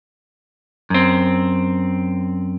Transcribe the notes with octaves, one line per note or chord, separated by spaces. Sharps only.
F#2 C4